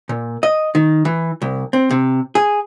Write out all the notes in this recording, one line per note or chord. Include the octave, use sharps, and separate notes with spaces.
A#2
D#5
D#3
E3
C2
C4
C3
G#4